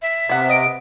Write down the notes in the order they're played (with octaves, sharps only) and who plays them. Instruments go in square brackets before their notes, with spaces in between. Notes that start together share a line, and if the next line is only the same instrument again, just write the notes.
[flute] E5
[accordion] C3 [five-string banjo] B3 F#5
[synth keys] D#5 D7